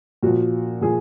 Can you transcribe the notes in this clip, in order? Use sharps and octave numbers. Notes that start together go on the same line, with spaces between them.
A#2 F3 F#4
A#2 F3 G#4